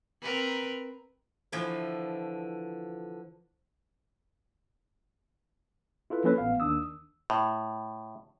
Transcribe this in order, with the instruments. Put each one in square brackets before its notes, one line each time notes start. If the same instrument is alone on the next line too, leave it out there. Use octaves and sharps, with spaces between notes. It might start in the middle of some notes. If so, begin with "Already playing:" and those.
[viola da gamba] C4 A#4 B4
[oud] D3 E3 F3
[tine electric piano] E4 F4 A4 B4
F3 A#3 C#4 A4 B4 C#5
A1 B3 F5
D#2 D#3 D4 D#6 E6
[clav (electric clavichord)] A2